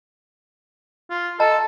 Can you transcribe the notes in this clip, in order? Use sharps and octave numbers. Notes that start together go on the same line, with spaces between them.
F4
A4 D#5 A5 A#5